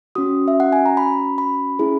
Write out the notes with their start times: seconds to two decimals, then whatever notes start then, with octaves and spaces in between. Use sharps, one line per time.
0.15 C#4 F#4 D#6
0.48 E5
0.60 F#5
0.72 G#5
0.86 A#5
0.97 B5
1.38 B5
1.79 C#4 E4 G#4